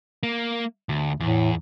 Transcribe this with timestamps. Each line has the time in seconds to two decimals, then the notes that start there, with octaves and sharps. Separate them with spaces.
0.23 A#3
0.89 D2
1.20 E2 A2